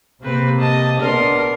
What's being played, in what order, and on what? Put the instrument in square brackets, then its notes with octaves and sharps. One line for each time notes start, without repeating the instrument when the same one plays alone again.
[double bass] C3 A#3 [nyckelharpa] C4 B4
[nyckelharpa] D#5 A5
[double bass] B3 D4 [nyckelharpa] A#4 C6